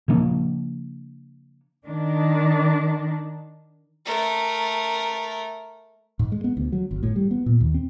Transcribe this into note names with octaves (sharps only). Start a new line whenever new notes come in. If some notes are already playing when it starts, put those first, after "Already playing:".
C#3 F3 A#3 D4
D#3 D4
A3 A#4
G#2
G#3
B3
D2
F#3
G1
A2
G3
B3
A#2
D#2
C4